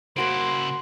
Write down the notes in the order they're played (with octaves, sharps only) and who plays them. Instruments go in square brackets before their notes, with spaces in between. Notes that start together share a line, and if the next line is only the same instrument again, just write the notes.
[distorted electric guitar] C#3 E4 [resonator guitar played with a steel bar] A#3 F#4 C5 [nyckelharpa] C6 [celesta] D7